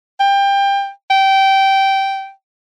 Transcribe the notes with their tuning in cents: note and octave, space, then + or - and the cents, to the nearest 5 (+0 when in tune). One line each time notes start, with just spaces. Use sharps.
G5 +25
G5 -15